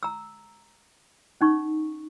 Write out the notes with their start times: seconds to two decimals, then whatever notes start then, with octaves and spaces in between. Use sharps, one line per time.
0.03 A#5 E6
1.41 C#4 D#4 C#6